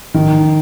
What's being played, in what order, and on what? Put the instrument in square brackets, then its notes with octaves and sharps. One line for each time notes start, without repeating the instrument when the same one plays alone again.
[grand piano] D#3